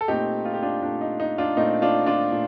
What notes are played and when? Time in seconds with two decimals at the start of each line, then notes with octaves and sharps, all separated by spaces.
0.01 A4
0.08 A#2 A3 C4 D#4 G4
0.45 F4
0.54 G4
0.62 D4 F4
0.82 A#2 A3 C4 D4
1.01 D#4
1.20 D#4
1.38 D4 F4
1.57 A#2 A3 C4 D#4
1.82 D4 F4
2.06 D4 F4
2.32 A#2 A3